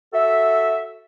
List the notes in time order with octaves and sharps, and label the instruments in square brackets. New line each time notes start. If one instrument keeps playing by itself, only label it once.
[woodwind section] F#4 A4 E5